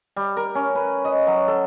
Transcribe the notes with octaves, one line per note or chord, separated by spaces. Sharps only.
G3
A#4
C#4
B4
D#5
F#3
A4